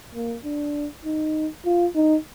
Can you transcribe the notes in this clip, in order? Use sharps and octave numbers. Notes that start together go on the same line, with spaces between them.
A#3
D4
D#4
F4
D#4